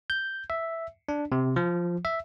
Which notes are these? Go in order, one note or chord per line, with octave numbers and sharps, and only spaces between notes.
G6
E5
D4
C3
F3
E5